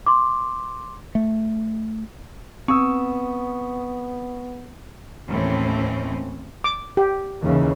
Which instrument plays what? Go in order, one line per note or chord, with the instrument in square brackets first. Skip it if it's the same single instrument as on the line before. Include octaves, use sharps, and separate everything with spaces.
[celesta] C6 D6
[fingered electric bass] A3
[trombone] B3 [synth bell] C4 [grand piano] C#6 D#6 E6
[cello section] D#2 A2 E3 C4 C#4
[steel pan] D6
G4
[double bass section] D#2 C#3 E3